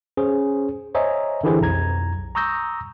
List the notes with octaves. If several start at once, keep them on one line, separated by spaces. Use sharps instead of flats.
C#4 G#4 C5
C5 C#5 D#5 E5 G#5 A#5
D3 E3 E4 G4 G#4 C5
B1 F2 A#5 G#6
A#5 C#6 D#6 E6 G6 A#6